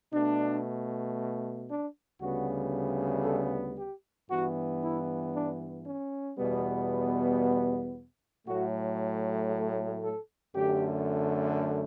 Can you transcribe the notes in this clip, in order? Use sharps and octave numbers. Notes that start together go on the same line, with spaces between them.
B2 A3 D4
D4
D2 C#3 G3 B3 F#4
A4
G4
G2 E3 B3 F#4
E4
D4
C#4
E2 B2 G3 B3
A2 F#3 A3 F#4
A4
A4
F#2 D3 A3 G4